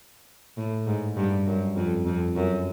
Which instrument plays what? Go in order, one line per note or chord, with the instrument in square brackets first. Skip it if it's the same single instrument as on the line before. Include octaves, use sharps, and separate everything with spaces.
[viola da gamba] A2
G#2
G2
F#2
F2
F2
F#2